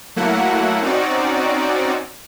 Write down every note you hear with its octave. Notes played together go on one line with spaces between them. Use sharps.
F#3 A3 A#3 E4 F#5
C4 C#4 D#4 F#4 D5